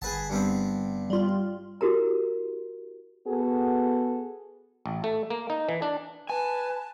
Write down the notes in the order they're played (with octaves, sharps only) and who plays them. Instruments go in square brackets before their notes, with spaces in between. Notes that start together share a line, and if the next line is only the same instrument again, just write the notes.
[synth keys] G1 [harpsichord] G#4 B4 A5
[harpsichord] G2 B3 C4
[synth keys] G3 F4
[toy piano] E4 F#4 G4 A#4 A#5
[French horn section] B3 F#4 G#4 A4
[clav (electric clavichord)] A1
A3
A#3
D#4
E3
D4
[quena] B4 [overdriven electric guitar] G#5 [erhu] A5